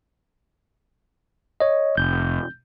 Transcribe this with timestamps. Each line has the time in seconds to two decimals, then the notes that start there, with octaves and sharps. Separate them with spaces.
1.60 C#5 D#5
1.97 F1 G6